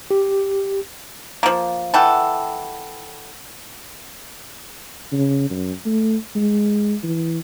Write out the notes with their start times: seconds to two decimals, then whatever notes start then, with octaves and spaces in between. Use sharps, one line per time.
0.11 G4
1.43 F3 A#3
1.94 E3 A4 F#5 G5 A5
5.12 C#3
5.50 F#2
5.86 A3
6.35 G#3
7.03 E3